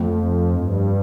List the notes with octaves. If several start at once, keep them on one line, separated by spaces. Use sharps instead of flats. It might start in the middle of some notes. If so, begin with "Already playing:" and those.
Already playing: F2 F3 A3 C4
G2